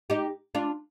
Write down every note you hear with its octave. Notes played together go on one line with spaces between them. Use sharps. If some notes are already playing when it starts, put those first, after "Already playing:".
D#4 G4
D4 F4